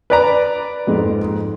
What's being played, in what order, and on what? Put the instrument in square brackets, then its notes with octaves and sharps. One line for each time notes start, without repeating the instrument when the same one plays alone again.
[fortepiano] B4 D5 A#5
[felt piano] F2 G#2 G#3